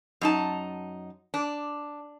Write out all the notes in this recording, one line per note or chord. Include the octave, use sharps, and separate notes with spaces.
F#2 D#4 A5
D4